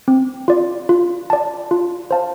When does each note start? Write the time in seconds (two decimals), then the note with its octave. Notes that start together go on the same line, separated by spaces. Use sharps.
0.08 C4
0.48 F4 D5
0.89 F4
1.30 D5 A5
1.71 F4
2.11 C5 F5 A5